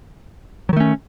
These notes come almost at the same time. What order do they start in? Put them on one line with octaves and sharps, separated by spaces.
F#3 D#3 A3 C#4